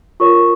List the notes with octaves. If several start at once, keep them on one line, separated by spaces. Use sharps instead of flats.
F4 A#4 C#5 C#6